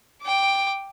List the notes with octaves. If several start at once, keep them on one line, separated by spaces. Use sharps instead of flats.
G5 D6